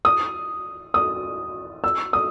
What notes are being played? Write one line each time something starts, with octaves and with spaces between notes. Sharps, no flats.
D#6
D#6
E6
D#6